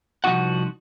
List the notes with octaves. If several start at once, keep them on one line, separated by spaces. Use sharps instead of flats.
C2 F3 D4 D#4 F#4 F#5